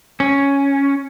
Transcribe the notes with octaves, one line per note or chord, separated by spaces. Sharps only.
C#4